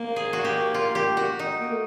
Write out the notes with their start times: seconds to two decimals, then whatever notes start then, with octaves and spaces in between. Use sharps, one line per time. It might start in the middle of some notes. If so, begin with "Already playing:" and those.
Already playing: A#3
0.16 G#4
0.33 F#4
0.45 G4
0.74 F4
0.95 G4
1.17 F#4
1.39 D#4
1.60 A#3
1.71 A3